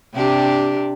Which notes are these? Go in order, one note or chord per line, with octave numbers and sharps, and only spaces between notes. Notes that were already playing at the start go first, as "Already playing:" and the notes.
C3 D4 G4